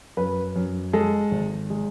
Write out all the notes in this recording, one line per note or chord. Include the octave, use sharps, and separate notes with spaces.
F#2 B4
F#2
G#3 A4
G#1
G#3